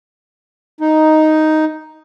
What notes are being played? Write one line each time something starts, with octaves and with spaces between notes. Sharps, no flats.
D#4